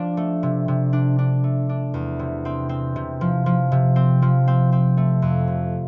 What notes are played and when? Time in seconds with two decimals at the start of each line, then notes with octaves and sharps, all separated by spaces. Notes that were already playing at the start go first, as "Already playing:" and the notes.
Already playing: F3 D4
0.17 A3
0.43 C3
0.68 C3
0.93 D4
1.19 D4
1.44 A3
1.69 D4
1.94 E2
2.19 C3
2.45 C4
2.69 C4
2.96 C3
3.21 F3
3.46 F3
3.72 C3
3.96 C4
4.22 F3
4.48 C4
4.72 C4
4.97 A3
5.22 F2
5.47 C3